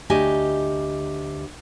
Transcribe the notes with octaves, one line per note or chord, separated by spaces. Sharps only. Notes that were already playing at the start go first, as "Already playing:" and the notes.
D2 G4 D#5 G#5